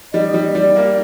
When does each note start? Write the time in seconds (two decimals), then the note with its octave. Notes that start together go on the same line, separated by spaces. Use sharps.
0.14 G3 D#5
0.34 G3
0.55 G3 D5
0.76 A#3